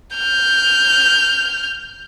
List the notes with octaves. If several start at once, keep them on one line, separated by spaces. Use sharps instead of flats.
F6 G6